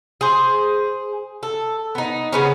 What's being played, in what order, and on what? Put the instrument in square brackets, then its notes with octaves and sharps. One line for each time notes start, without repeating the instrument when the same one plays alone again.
[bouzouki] G#4 C5
A4
B3 D#4
C#3 B3 C#4